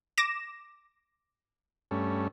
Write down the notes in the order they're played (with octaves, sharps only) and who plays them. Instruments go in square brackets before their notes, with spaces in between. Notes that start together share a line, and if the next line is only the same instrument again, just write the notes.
[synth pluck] D6 A#6 E7
[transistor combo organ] G2 A3 C#4